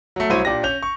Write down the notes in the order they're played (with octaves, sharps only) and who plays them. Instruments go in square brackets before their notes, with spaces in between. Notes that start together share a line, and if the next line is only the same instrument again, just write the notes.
[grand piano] F#3 A3
C2 F#3 E4 C5 C#5 D#7
A#2 D4 G4 A#6
C#4 G6 F7
C#6